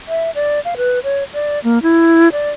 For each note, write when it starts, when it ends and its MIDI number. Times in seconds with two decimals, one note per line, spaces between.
0.08 0.30 76
0.35 0.60 74
0.65 0.75 77
0.77 0.99 71
1.04 1.24 73
1.34 1.59 74
1.64 1.79 58
1.83 2.31 64
2.32 2.51 74